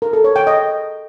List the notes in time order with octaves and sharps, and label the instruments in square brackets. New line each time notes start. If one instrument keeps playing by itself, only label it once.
[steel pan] A#4
A4
C#5
G5
D#5